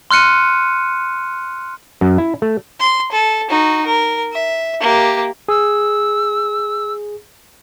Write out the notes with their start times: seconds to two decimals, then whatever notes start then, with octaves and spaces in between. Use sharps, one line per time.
0.11 C6 F6 F#6 C#7 D#7
2.01 F#2
2.18 E4
2.42 A3
2.80 C6
3.12 A4
3.50 D#4 F#4
3.86 A#4
4.33 E5
4.81 A#3 G4
5.49 G#4 E6